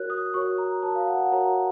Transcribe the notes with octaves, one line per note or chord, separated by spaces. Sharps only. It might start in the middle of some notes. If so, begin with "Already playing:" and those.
Already playing: F#4 A#4 C#5 F#6
D#6
F#4 A#4 C#5 C#6
A#5
F#4 A#4 C#5 A5
F5
F#5
F#5
F#4 A#4 C#5 A#5